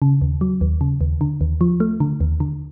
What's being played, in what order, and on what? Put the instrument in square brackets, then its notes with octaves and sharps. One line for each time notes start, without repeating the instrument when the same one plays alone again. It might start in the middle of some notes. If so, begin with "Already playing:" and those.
[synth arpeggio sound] C#3
D#2
F#3
D#2
C#3
D#2
D3
D#2
F3
A3
D3
D#2
D3